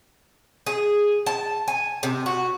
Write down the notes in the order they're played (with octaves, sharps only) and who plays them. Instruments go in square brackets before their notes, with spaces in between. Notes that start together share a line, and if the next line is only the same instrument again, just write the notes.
[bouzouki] G#4
A5
G#5
C3
F#4